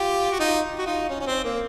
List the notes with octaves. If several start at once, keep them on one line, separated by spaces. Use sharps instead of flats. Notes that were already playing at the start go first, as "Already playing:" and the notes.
Already playing: F4 G4
F#4
D#4 F4
F#4
D#4 F4
C#4
C#4
C4
A#3